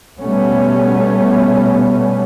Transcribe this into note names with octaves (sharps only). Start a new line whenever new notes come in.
B2 G3 A3 B3 C#4